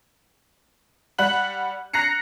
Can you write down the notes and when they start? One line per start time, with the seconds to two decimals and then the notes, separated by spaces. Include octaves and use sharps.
1.18 G3 F#5 B5 F#6 F#7
1.93 A#5 F#6 A#6 C7 C#7